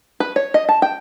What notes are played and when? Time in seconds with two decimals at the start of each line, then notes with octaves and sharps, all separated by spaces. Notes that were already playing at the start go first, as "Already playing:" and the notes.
0.20 B4
0.36 C#5
0.54 D#5
0.69 A5
0.82 G5